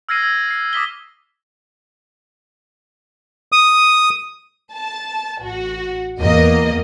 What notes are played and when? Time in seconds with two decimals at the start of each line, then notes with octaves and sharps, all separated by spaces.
0.09 E6 F6 G#6 A#6 C7 D#7
0.22 E6 G#6 A#6
0.49 G#6 C7
0.73 D6 D#6 B6 G7
3.52 D#6
4.75 A5
5.42 A1 F#4
6.21 E2 A#3 A#4 D#5